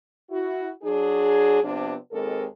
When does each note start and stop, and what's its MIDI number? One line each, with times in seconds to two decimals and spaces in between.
0.30 0.70 64
0.30 0.70 66
0.82 1.63 54
0.82 1.63 62
0.82 1.63 68
1.63 1.96 48
1.63 1.96 53
1.63 1.96 59
1.63 1.96 62
2.12 2.45 39
2.12 2.45 56
2.12 2.45 60
2.12 2.45 69
2.12 2.45 70